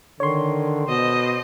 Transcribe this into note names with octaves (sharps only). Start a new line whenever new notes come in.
D3 D#3 C#5 C6
B2 C5 D#5